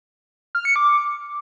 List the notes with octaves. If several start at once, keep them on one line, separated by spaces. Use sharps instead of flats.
F6
C#7
D6